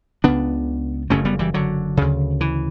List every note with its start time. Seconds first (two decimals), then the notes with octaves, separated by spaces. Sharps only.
0.24 C#2 C#3 B3 D4
1.10 F#1 F#2 C#3 A3 C#4
1.25 G3 B3
1.39 E3 G3
1.54 D3 F#3
1.97 D2 C#3
2.41 E3